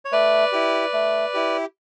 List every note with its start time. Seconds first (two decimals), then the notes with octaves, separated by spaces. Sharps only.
0.05 C#5
0.12 A3 B4 D5
0.52 E4 G4
0.93 A3
1.34 E4 G4